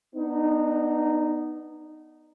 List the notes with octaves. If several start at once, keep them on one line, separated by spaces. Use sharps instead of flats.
B3 D4 D#4